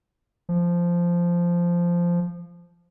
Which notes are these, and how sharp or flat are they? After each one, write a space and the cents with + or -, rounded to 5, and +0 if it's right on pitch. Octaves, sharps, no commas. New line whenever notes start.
F3 -10